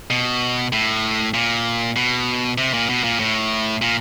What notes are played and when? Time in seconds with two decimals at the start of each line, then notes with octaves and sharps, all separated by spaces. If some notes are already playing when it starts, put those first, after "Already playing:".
0.10 B2
0.73 A2
1.34 A#2
1.96 B2
2.58 C3
2.74 A#2
2.89 B2
3.04 A#2
3.19 A2
3.82 A#2